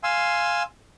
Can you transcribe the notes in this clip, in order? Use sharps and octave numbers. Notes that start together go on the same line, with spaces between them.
F5 G#5 C6 E6